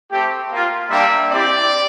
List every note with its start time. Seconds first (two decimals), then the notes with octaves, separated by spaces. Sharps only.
0.11 A3 C4 G4
0.51 A#3 F4
0.89 G3 A#3 D4 G4 E5
1.30 C4 E4 G4 D5